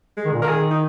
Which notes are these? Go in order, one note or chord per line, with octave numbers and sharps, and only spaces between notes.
G#3
D#3
A#2
D#3 A#4
G#4
D#4